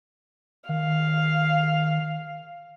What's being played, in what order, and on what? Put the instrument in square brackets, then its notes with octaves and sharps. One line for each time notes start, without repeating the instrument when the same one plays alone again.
[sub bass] D#3 [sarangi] F5